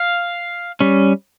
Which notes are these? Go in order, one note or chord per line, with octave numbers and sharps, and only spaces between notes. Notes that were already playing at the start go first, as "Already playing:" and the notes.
Already playing: F5
G3 C#4